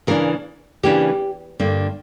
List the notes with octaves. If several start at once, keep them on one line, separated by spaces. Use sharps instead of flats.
C#3 E3 A#3 D4 A#4
C#3 E3 A#3 D4 G4
G2 D3 A#3